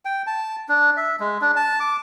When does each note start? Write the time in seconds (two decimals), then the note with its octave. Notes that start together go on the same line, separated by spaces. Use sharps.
0.05 G5
0.27 A5
0.69 D4
0.97 E5
1.20 G#3
1.41 D4
1.56 A5
1.80 D6